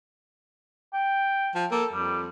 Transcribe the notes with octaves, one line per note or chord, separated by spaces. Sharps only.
G5
F3
A#3 A4
F2 G3